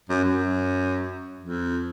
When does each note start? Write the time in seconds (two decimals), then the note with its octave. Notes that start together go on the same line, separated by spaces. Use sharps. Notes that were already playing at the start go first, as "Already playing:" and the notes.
0.09 F#2
0.24 F#2
1.41 F2